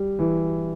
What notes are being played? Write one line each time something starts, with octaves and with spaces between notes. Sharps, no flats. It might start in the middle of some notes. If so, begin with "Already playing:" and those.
Already playing: G3
E3